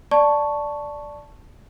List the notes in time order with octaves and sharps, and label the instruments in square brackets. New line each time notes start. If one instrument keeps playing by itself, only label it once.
[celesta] D5 A5 C#6